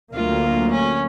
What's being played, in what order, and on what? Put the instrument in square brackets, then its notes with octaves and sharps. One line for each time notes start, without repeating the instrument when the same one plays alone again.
[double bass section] D2 F#3 A#3 [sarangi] F4
[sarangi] C#4